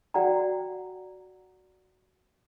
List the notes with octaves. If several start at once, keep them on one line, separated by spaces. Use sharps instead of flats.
F#4 D5 F#5 G5 A#5